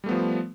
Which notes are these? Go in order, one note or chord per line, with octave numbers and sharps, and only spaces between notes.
F3 G3 A3 B3